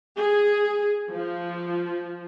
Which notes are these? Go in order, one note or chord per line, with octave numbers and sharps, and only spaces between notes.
G#4
F3